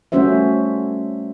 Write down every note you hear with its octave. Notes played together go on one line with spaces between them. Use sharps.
G3 A3 C#4 F#4 C5 E5